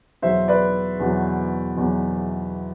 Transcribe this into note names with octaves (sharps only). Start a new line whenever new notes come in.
E2 B2 F#3 C5 E5
B4 D5
E2 B2 F#3
E2 B2 F#3